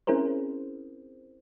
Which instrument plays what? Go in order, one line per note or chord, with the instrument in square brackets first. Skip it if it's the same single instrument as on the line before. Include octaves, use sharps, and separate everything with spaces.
[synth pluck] C4 C#4 E4 G#4 A#4 C5